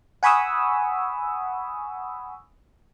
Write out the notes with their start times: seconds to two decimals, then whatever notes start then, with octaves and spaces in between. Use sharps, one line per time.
0.23 F#5 G#5 B5 C#6 D#6 E6